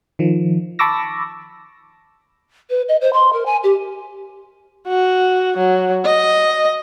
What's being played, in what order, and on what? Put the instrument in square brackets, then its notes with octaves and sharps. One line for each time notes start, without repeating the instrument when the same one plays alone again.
[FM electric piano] D#3 F3
A5 B5 C#6 D6 E6 A#6
[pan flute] B4
D#5
C5
C6
A#4
G#5
G4
[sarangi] F#4
F#3
D#5